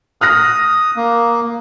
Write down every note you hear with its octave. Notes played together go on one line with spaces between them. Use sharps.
D#6 F6 F#6 A#6
A#3